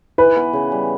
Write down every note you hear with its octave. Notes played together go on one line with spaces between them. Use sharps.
E3 B4
B3
C#3
G3